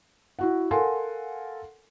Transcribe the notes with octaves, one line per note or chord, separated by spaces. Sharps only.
E4 F#4 F#5
A4 A#4 F5 F#5 G#5 C6